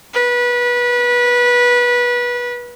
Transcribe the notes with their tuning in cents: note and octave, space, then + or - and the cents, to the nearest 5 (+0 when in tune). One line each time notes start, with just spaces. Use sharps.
B4 -25